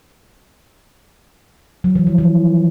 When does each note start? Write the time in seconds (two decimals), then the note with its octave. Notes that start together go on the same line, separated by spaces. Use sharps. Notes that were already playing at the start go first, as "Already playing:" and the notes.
1.84 F#3
1.96 E3
2.07 F3
2.18 E3